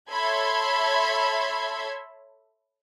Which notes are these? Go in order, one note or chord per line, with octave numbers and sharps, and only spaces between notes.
A4 C#5 E5 B5 C6 G#6